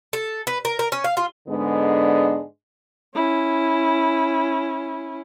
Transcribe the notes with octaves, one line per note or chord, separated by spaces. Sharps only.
A4
B4
A#4
A#4
C#4
F5
F4
G#2 D3 G#3 B3 D4
C#4 E4